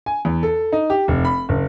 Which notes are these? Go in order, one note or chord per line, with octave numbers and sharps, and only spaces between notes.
G#5
E2
A4
D#4
G4
F1
B5
F#1